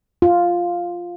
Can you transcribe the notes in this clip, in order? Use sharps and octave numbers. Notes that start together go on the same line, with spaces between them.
F4